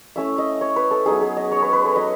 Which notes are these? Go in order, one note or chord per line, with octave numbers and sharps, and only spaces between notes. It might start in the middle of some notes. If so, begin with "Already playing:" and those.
A3 C#4 E4 E5
D#5
C#5
B4
A4
F#3 B3 D#4 G#4
G#4
D#5
C#5
B4
B4
A4
F#3 B3 D#4 D#5